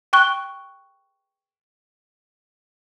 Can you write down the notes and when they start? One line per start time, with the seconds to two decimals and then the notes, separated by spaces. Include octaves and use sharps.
0.13 G5 C#6 F#6 G7